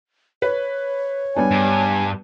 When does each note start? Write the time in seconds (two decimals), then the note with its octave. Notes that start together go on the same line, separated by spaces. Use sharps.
0.42 B4 C#5
1.36 G3 B3 D4 G#5
1.51 G2